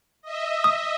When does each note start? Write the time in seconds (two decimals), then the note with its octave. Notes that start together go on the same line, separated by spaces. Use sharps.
0.22 D#5 E5
0.64 D#6